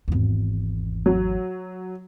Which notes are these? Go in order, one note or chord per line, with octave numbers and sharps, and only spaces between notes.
G#1 E2
F#3